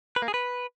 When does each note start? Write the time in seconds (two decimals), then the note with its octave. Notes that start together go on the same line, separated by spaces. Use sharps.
0.16 B4
0.22 A#3
0.28 G#4
0.34 B4